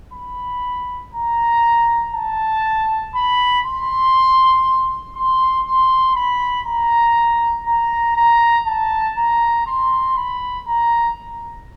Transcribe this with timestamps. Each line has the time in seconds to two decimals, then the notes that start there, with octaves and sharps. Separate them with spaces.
0.14 B5
1.14 A#5
2.15 A5
3.15 B5
3.65 C6
5.16 C6
5.66 C6
6.16 B5
6.66 A#5
7.67 A#5
8.17 A#5
8.67 A5
9.17 A#5
9.67 C6
10.17 B5
10.67 A#5